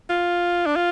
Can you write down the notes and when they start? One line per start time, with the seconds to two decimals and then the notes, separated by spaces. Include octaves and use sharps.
0.09 F4
0.66 D4
0.76 F4